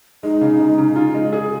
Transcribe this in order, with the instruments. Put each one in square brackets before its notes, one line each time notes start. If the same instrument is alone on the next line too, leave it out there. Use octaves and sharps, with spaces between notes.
[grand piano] G#3 [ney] D#4
[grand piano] C#3
G#3
C#3
F4
G#3
G#4